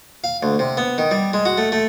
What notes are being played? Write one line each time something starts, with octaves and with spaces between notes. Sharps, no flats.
F5
D2
C3
B3
D#3
G3
G#3
F#4
A3
A3